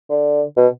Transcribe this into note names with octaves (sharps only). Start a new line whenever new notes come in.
D3
B2